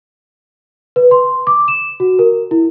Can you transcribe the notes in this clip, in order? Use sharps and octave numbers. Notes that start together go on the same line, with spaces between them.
B4
C6
D6
E7
F#4
A#4
E4